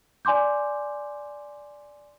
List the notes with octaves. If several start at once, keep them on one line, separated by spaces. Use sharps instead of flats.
D5 G#5 C6 D6 G6